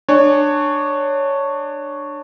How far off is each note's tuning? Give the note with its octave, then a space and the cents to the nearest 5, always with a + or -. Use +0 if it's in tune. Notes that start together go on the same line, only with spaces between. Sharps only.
D4 +20 C#5 +0 G#5 +0